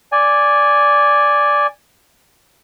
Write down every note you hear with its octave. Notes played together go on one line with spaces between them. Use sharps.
D5 G#5